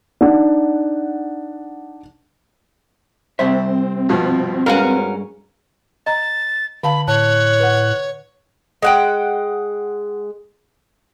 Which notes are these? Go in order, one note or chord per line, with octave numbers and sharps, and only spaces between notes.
D4 D#4 F#5
C3 G3 C4 C5 E5
G2 B2 F3
G2 G#3 B3 C#4 F#4 A#4 F5
D#5 A#5 A6
D3 F5 A5 B5
A2 C#5 A5 F#6
B4 F#5
G#3 F#5 G5